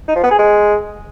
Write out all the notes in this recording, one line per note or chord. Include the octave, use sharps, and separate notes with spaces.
D#4
F3
B3
G#4
G#3